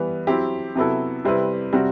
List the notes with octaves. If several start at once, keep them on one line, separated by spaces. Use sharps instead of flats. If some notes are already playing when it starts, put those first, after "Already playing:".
Already playing: E3 G3 B3
F#3 C4 E4 G4
C3 F#3 B3 E4 A4
C3 G3 C4 E4 B4
C3 G3 C4 F#4